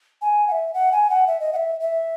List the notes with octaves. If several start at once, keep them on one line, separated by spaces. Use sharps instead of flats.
G#5
F#5
E5
F#5
G#5
F#5
E5
D#5
F#5
E5
E5